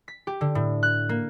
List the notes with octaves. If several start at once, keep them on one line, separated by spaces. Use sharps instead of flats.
B6
G4
D3
A2
F#6
A#3